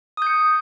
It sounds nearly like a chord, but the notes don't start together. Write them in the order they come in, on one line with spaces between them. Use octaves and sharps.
D#6 G6 C#7